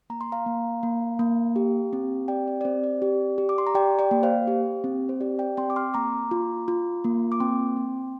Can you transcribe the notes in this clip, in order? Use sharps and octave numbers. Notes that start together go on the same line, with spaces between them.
A#3 A#5
C6
F5 A#5
A#3
A#3
A#3
G4
C4
G4 D5 G5
D5
D5
C4 C5
D5
G4
G4
D6
C6
A#5
G4 D5 G5
D5 G5
A#3
C5 F5
G4
C4
C5
G4 D5
D5 G5
C4 G5 C6
D6
C6 F6
A#3 A#5 D6
F4
F4
A#3
D6
C4 G5 C6
C4